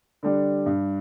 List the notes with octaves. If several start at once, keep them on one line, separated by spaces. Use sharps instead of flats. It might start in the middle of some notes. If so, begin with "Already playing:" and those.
D3 G3 D4
G2